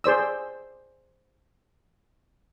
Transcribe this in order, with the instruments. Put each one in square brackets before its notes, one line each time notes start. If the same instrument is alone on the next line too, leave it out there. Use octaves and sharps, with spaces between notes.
[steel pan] G#4 C5 D5 E6